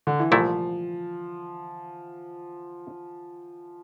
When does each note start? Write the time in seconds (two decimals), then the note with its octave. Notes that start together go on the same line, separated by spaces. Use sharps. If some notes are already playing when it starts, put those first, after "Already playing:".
0.07 D3
0.19 E3
0.32 C2 A#2 F3 A3 E4